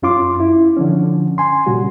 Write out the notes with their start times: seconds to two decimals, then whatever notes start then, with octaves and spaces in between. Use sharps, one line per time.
0.02 F#2 C#4 F4 C6 D6
0.40 E4
0.76 D3 F3 C#4
1.38 G#5 C6
1.66 A#2 C#3 G3 F#4